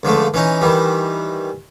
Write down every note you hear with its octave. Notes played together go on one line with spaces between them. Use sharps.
C#2 D3 F3 A3
E3 C#4 D#4
D#3 E3 G3